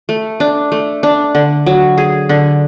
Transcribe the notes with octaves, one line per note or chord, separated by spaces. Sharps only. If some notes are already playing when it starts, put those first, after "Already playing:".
A3
D4
A3
D4
D3
F#3
G#4
D3